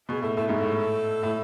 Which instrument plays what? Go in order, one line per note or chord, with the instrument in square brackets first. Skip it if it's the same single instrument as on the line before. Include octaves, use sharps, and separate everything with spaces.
[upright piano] B2 [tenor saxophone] G#4
[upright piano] A2 [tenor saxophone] A4
[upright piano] A2 [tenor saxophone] A4
[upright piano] G#2 [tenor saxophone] G#4
[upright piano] A2 [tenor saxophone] A4
[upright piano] A2